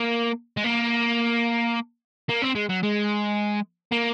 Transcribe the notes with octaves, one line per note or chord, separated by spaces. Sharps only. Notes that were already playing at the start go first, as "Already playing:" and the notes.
Already playing: A#3
G#3
A#3
A#3
C4
G#3
F#3
G#3
A#3